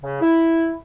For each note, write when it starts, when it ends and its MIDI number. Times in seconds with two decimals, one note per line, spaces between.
0.02 0.19 49
0.22 0.74 64